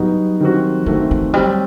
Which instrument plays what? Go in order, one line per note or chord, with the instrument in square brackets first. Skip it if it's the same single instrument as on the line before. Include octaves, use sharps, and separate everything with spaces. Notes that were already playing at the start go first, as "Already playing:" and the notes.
Already playing: [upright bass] F#3 [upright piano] G3 B3 D#4 F#4
[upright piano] D#3 G3 C4 F#4
[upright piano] D#3 A3 C4 F#4 [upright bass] E3
[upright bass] E3
[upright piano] F#3 C4 F#4 [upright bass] G3